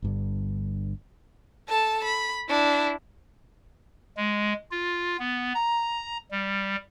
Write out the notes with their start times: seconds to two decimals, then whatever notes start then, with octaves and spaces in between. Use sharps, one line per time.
0.02 G1 G2 D3
1.69 A4 A5
2.04 B5
2.49 D4 E4
4.17 G#3
4.71 F4
5.19 B3
5.54 A#5
6.31 G3